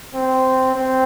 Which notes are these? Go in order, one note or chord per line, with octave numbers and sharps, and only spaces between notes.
C4
C4